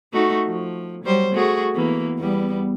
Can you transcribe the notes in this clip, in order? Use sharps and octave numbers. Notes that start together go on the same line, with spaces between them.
A3 D#4 F#4
F3
F#3 G3 C5
A3 F#4 G#4
E3 A#3 B3
E2 G3 B3